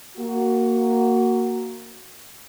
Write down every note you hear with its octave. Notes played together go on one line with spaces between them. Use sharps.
A#3 F#4